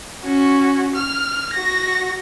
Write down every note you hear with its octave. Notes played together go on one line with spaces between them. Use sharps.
C#4 F#4
F6
F#4 A#6